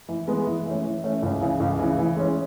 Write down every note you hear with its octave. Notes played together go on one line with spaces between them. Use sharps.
E3
G#3 B3
E3
A3 C#4
E3
A3 C#4
C#2
C#3 E3
C#2
C#3 E3
E3
G#3 C#4